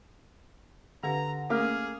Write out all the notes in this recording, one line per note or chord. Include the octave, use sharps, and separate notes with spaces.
D3 G4 B4 F5 A#5
A3 A#3 C#4 G#4 F5